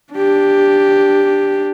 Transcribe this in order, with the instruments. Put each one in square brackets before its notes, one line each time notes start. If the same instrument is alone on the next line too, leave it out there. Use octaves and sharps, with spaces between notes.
[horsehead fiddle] D4 G4